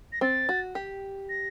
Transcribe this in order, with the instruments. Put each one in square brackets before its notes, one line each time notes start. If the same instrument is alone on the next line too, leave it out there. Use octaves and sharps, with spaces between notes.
[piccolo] A#6
[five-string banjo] C4 [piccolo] A6
[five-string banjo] F#4
G4
[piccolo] A#6